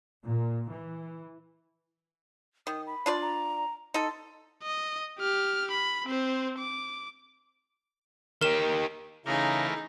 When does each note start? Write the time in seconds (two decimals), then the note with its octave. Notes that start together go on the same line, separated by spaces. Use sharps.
0.24 A#2
0.72 E3
2.67 D#3 D#6
2.87 B5
3.06 D4 F4 D5
3.22 A#5
3.94 D#4 A4 C6
4.63 D#5
5.19 G4 F6
5.71 B5
6.06 C4 C5
6.59 D6
8.41 D#3 G4 A#4 E7
9.26 C#3 E3 A3 D#4 G#4 A#4